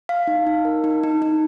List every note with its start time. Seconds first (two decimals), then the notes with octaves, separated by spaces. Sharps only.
0.09 F5
0.27 D#4
0.47 D#4
0.65 A#4
0.84 D#4
1.03 D#4
1.22 D#4